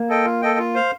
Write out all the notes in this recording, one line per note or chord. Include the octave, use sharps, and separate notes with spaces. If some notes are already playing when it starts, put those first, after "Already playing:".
Already playing: A#3
A4 D#5 G5
F4
A4 D#5 G5
F4
C5 F5